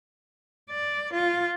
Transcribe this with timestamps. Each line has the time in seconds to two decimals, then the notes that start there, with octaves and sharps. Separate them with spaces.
0.70 D5
1.13 F4